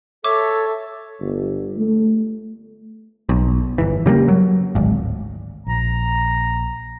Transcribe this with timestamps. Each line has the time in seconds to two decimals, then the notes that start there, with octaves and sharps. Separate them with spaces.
0.24 A4 C#5 E5 D6
1.21 G1
1.77 A3
3.29 B1
3.78 G1 E3
4.06 C#3 G3 A3 A#3
4.28 F#3
4.75 D1 G#1
5.67 A#1 A#5